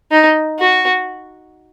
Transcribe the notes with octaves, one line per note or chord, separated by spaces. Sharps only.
D#4
F#4